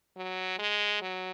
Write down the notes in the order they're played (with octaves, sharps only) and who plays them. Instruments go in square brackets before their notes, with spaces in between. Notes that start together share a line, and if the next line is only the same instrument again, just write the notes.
[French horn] F#3
G#3
F#3